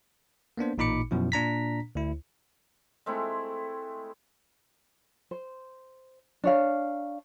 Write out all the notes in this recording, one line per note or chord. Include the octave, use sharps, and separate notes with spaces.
A#3 B3 D4 C5
A1 A#2 D#4 B5 D6 C#7
F#2 B2 F3 E4
A#2 D4 A#5 B6
D2 E4
G#3 A3 C4 E4
C5
D4 C#5 F5